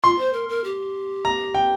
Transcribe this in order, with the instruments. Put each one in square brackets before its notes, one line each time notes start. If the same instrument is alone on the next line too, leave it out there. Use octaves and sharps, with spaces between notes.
[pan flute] F4 [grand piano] C6
[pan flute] C5
A#4
A#4
G4
[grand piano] A#5
G5